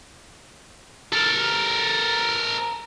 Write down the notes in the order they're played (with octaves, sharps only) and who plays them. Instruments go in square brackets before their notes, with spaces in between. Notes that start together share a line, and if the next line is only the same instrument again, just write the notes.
[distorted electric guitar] A4 A#4